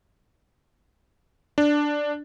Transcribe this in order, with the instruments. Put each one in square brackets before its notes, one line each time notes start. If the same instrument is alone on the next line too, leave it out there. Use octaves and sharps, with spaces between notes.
[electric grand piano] D4